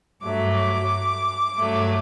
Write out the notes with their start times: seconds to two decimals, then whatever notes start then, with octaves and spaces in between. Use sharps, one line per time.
0.22 G2 F#3 A3 D6
0.56 D6
1.57 G2 F#3 A3